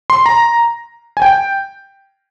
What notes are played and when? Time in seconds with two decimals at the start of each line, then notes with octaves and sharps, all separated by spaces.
0.10 C6
0.26 A#5
1.17 G#5
1.22 G5